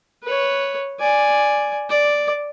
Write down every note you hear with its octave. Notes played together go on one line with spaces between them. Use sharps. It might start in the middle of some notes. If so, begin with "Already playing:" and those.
B4 C#5
D5 G#5
D5